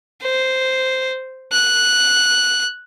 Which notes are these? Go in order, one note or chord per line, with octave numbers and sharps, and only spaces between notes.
C5
F#6